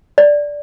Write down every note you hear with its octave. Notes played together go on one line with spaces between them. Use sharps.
D5